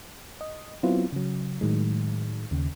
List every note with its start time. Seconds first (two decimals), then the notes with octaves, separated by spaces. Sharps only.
0.41 D#5
0.83 F#3 B3 C4 E4 F4
1.12 C#3 F#3
1.61 A2 D#3 F#3 G#3
2.51 D#2 C#3